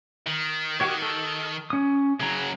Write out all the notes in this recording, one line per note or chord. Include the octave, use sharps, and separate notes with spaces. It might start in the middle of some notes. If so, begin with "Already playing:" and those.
D#3
F#4 G4 C#5
A4
C#4 D#6
C#3 F#3 G#4 A#5